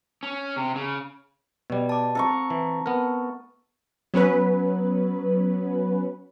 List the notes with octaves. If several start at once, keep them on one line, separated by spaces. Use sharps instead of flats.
C#4
C3
C#3
B2 G3 B3 D5
A5 D6
C4 A4 A#5 C#6
E3
B3 A#4
F#3 B3 C#4 B4